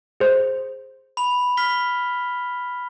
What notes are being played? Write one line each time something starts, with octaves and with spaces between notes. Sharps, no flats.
G#4 C5
B5 F7
F6 B6 G7